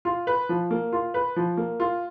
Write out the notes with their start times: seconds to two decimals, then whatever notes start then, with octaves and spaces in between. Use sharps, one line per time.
0.05 F4
0.27 B4
0.49 F3
0.71 A#3
0.93 F4
1.14 B4
1.36 F3
1.57 A#3
1.80 F4